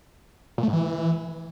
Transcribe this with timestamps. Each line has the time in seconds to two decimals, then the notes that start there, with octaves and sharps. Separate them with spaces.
0.58 A#2
0.63 A3
0.68 G#2
0.73 E3